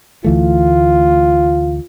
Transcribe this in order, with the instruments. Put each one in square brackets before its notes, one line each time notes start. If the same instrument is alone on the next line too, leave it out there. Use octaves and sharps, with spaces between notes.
[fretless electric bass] D2 E3 A3 [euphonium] F4